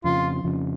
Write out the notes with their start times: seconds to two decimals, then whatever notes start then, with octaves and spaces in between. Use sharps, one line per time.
0.04 F2 C#3 F3 F4
0.44 F2 C#3 F3